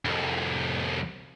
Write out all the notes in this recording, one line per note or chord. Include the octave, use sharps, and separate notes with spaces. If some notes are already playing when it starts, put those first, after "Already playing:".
C2 F2